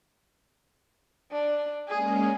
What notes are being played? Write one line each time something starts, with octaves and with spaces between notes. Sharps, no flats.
D4
G#3 A#3 C#4 G#4